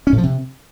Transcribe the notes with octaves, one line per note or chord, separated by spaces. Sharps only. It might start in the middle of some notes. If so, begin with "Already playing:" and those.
C#4
A2
F3
C3